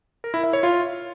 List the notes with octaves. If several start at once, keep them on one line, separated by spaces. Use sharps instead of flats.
A#4
E4
E5
C#5
F4